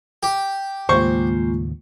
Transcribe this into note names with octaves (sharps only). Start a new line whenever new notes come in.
G4
D#2 A2 C#3 G#3 A#3 F4 C5 C#6